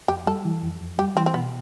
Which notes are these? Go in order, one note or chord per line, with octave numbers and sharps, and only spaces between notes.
F2 G4
G3 A4
E3
F2
F2
G3 G4
E3 C4
C4
B2 B3